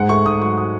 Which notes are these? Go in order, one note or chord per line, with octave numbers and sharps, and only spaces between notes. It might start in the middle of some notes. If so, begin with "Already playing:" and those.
Already playing: G#2 G#3 F#5
A3 C#6
G#2 D#6
F#3 C#6
D#6